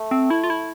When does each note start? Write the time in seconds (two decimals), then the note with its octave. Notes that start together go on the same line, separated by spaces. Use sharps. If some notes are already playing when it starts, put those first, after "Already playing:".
Already playing: A3
0.11 C4
0.30 E4
0.44 F4
0.50 E4